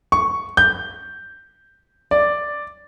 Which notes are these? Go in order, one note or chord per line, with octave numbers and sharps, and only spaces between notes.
C#6
G6
D5